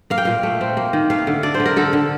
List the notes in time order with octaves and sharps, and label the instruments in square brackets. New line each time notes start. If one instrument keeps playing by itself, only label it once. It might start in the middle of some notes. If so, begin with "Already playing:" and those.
[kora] A#3 F5
G5
A#2 F5
A3
C4
A#3
D#3
A3 F5
D3
D4 D5
C5
D3
A#4
D3 A4
D3